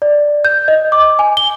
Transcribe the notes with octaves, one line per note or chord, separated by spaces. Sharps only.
D5
G6
D#5
D6
G#5
G7